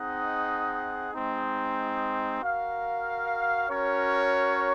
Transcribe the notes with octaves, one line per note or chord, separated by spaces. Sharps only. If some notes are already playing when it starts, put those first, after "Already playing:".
Already playing: C4 D#4 G#4 D#5 F#5
G#3 C4 D#4
F#4 A#4 F5
C#4 F#4 A#4 C#5